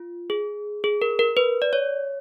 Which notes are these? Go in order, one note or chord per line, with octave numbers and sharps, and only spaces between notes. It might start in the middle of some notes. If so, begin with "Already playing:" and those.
Already playing: F4
G#4
G#4
A#4
A#4
B4
D5
C#5